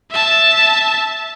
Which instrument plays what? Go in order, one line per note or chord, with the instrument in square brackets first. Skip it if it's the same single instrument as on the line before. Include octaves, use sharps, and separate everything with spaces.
[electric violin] E5 A5